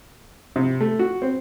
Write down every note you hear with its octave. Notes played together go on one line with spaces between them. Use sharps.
C3
A3
F#4
C4